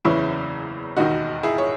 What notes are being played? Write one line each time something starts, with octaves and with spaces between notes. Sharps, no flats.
F#1 E2 C#3 E3 C#4 E4
E1 D#2 D#3 D#4 F#4
E4 G#4
C#5